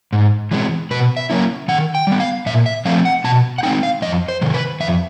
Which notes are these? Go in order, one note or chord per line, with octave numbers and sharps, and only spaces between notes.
G#2
E3 G#3 C4
B2 B4
E5
F#3 A#3 C#4 E4
D#3 F#5
G5
G3 B3
F5
A#2 E5
E5
F3 A3 C4 F5
F#5
B2 A5
F#5
G#3 C4 D#4 G5
F5
F2 D#5
C5
C3 D#3
B4
F2 E5